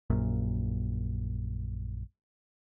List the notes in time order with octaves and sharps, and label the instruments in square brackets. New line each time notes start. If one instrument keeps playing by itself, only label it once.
[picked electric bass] A#1 F#2 A#2